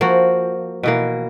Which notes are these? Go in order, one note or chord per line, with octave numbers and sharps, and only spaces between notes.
F3 A#3 F#4
B2 E3 A#3